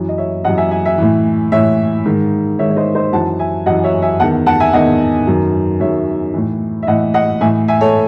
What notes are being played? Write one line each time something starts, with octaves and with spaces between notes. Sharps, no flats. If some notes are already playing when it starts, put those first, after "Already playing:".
Already playing: F#2 E3
D#5
C#5 E5
F#2 E3 D#5 F#5
E5 G#5
E5 G#5
E5 G#5
A2 E3
A2 E3 C#5 E5
G#2 D#3
G#2 D#3 C#5 E5
C#5
C5 D#5
C5 D#5
F#2 E3 F#5 A5
E5 G#5
F#2 E3 D#5 F#5
C#5 E5
E5 G#5
E2 D#3 F#5 A5
F#5 A5
E5 G#5
E2 D#3 D#5 F#5
F#2 D#3
F#2 D#3 C#5 E5
A2 E3
E5
A2 E3 D#5 F#5
D#5 F#5
A2 E3 E5 G#5
E5 G#5
A4 C#5